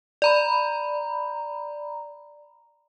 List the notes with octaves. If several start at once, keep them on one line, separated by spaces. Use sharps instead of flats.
D5 A#5 B5